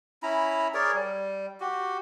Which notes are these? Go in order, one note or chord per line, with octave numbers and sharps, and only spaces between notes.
C#4 E4 A#5 B5
G#4 A#4 C#5 D5
G3
F#4 G4